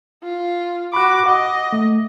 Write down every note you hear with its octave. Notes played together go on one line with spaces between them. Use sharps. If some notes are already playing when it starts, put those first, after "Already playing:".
F4
F#4 B5 C#6 D6 F#6
D#5 F#5 D6
A3